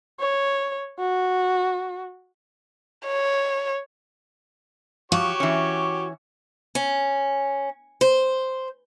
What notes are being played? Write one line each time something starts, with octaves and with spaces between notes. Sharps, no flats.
C#5
F#4
C#5
F3 F#4 G4 C#5
E3 C#4
C#4
C5